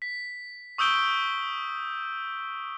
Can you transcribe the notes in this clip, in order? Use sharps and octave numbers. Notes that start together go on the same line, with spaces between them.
B6
C#6 D#6 E6 G6 D7 G7